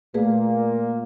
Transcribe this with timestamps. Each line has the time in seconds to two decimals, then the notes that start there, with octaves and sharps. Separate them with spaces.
0.14 A#2 A3 A#3 G#4 B4